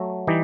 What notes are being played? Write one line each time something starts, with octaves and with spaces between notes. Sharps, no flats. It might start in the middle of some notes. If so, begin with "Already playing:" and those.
Already playing: F#3 A3
E3 G3 D#4 G4